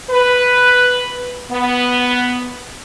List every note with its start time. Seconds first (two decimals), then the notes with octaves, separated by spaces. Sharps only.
0.10 B4
1.51 B3